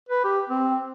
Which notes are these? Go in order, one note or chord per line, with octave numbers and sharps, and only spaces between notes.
B4
G4
C4